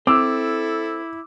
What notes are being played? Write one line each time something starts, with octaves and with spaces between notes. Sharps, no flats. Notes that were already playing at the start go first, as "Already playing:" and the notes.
C4 E4 A4 D6 E6